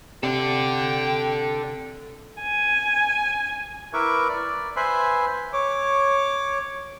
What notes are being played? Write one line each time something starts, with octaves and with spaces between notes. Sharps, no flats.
C3 A4 D5 G5
G#5
E4 A#4 B4 E5 C#6 D6
D5
B4 C5 E5 G#5 B5 C6
C#5 D6